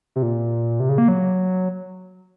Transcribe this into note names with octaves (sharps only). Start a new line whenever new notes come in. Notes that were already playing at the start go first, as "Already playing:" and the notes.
C3
A#2
C3
C#3
A#3
F#3